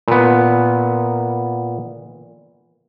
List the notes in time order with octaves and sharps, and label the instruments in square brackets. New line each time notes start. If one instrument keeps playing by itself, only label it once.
[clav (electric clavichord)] A#2 B3